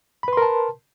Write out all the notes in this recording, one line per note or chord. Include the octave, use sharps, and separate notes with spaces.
A#4 B4 A5 B5 C6